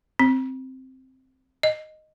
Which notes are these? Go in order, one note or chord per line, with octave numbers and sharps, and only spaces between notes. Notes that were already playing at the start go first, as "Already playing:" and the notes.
C4
D#5